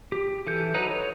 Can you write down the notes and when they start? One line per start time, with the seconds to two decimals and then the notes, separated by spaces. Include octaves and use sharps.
0.12 G4
0.47 E3 A4 G6
0.74 F#3 D#4 B4
0.89 C#5